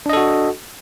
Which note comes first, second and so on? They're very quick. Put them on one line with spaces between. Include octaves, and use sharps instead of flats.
D4 D#5 A4 F#4